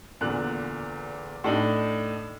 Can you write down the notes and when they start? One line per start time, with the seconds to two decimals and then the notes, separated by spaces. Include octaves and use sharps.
0.21 E2 A#2 D3 F#6
1.44 A2 D4 D#4